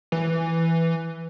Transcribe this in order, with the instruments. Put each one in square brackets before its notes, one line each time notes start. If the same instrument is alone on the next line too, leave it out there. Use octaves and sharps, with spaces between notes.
[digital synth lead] E3